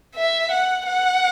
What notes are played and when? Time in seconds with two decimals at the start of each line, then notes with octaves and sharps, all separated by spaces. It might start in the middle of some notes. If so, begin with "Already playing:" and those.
0.15 E5
0.52 F#5
0.86 F#5